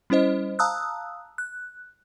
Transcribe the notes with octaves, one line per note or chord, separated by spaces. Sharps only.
G3 C#4 E4 C5 D#5
F5 A5 A#5 D#6 E6 F#6
F#6